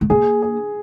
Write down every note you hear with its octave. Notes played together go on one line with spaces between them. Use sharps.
A3
A#3 G#4
G#4